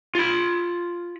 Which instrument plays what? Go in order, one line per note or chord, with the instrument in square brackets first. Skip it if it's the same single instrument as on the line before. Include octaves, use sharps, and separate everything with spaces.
[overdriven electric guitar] F4 B5